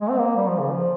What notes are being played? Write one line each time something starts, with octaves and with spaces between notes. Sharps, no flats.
G#3
C4
A#3
G3
F3
C#3
F3